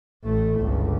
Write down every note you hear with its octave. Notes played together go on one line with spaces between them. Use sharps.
A1 A3
G1 C#2